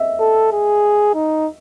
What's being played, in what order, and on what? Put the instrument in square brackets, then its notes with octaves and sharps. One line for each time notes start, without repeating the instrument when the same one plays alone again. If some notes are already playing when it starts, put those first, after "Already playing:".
Already playing: [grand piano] D#5 E5
[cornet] A4
G#4
D#4